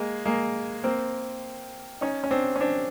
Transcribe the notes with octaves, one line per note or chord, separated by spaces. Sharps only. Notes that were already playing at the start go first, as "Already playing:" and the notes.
Already playing: G#3 A#3
G#3 A#3
A#3 C4
C#4 D#4
C#4
C4 D4
C#4
C4 D4